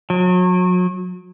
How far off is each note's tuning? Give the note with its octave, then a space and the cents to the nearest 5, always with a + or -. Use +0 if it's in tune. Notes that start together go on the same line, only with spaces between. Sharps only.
F#3 -35